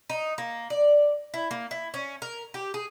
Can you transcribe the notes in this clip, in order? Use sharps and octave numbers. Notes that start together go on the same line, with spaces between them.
D#4
A#3
D5
E4
A#3
E4
C#4
A#4
G4
G#4